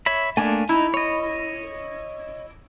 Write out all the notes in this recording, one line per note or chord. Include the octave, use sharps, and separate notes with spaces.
C#5 E5 B5
A3 A#3 D4 G#5
D#4 E4
C#5 D#5